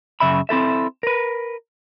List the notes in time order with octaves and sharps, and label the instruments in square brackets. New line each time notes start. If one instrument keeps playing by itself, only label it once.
[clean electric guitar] F#2 C#3 E5 B5
C4 E4 A4 E5
A#4 B4